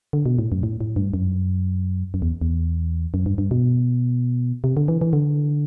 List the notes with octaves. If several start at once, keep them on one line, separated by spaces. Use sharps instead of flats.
D3
B2
A2
F#2
A2
A2
G2
F#2
F#2
E2
E2
F#2
G2
G2
B2
C3
D3
E3
E3
D3